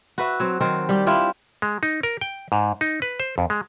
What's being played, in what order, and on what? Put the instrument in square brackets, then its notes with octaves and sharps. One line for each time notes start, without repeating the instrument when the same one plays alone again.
[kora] F#4 B4 E5
F#3 C4
D#3 F#3 C4
G3 G4
D4 E4 F4 G4
[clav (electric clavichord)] G#3
D#4
A#4
G5
G#2
D#4
B4
C5
F2
G#3